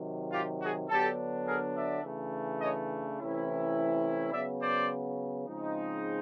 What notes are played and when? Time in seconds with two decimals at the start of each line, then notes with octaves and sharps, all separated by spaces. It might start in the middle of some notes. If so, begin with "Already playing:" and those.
Already playing: C3 D#3 F#3
0.32 F4 G4
0.61 F#4 G#4
0.89 D3 F#3 B3 D4 G4 A4
1.46 G#4 A#4
1.75 D5 E5
2.04 C#3 E3 A3 D4
2.61 C#5 D#5
3.18 C3 E3 A3 C#4 E4
4.32 C#3 F#3 B3 D5 E5
4.61 C5 D5
5.46 C#3 F3 G#3 C4 D#4